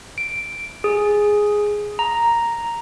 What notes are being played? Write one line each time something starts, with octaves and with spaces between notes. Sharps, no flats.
D7
G#4
A#5